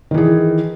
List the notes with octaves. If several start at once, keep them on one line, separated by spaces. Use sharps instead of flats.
D#3 E3 G#4